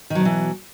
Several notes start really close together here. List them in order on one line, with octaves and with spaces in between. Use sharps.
D#3 F#3 B2 E3